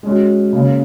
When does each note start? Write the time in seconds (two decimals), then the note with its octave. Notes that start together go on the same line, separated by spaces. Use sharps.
0.03 G#3 C#4 F#4
0.53 C#3 A#3 C#4